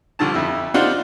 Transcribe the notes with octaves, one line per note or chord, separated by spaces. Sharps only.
C2 D3 F3 A5
F2 E4
D4 D#4 F4 C5 F#5